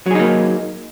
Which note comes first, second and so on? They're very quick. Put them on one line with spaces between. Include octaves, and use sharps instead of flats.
F#3 G#4 D#4 A#3